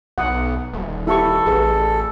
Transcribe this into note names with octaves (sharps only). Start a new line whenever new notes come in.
B1 F#5 D#6
D#1
E4 G4 A4 C#6
A1 G#4 B4